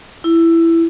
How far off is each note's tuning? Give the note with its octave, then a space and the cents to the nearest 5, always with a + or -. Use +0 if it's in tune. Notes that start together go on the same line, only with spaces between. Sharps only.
E4 +10